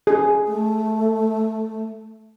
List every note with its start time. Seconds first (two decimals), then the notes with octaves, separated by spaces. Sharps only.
0.07 G#4
0.47 A3